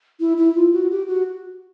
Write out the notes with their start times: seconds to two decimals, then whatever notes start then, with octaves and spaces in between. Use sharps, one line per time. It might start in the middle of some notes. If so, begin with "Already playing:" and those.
0.20 E4
0.37 E4
0.55 F4
0.72 F#4
0.90 G4
1.07 F#4